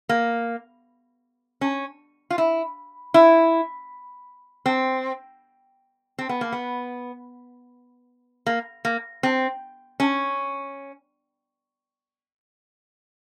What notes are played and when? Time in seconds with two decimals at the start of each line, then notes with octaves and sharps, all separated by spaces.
0.09 A#3
1.61 C#4
2.30 F4
2.38 E4
3.14 E4
4.66 C4
6.19 C4
6.29 B3
6.41 A#3
6.52 B3
8.46 A#3
8.85 A#3
9.23 C4
10.00 C#4